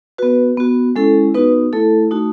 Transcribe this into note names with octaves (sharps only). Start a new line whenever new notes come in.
B3 F#4 B4
B3 F#4
G#3 C#4 E4 A4
B3 D#4 F#4 B4
A3 E4 A4
A3 D#4 F#4